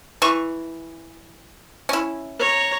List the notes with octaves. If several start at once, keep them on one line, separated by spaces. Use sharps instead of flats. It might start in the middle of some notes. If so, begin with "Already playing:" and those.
E3 C#6
C#4 E4
C#5 A#5